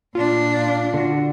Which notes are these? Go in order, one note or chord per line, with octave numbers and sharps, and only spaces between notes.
A#2 D4 F4
D3 F#4